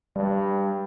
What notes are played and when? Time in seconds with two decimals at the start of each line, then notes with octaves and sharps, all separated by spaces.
0.16 G2 G3